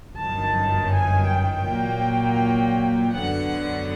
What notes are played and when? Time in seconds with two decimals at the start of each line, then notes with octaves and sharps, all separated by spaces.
0.18 G1 F#2 D#3 A5
0.92 G#5
1.29 G5
1.67 A#2 F#3 A#3
3.14 F#2 D3 F#3 B3 F#5